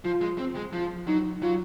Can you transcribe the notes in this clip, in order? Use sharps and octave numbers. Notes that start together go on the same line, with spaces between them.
F3 F4
G#3
C4
G#3
F3 F4
F#3 D#4
F#3 F4